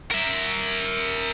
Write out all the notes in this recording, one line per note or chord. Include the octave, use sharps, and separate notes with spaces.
A#4 E5